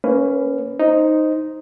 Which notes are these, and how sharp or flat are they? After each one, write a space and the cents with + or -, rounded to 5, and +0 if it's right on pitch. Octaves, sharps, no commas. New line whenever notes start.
A#3 +0 C#4 +0 B4 +20
D#4 +0 C5 +0